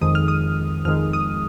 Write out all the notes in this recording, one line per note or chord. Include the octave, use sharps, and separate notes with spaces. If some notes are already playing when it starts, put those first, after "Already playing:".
F2 D#3 G#3 D#6
F6
D#6
F2 D#3 G#3 F6
D#6